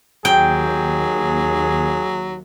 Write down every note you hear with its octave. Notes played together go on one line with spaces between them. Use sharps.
D#2 F#3 G#4 G5